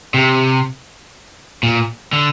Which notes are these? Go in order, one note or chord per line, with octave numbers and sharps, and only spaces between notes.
C3
A#2
D3